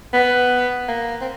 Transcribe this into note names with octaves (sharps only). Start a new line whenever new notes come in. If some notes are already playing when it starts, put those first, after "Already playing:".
B3
A#3
C4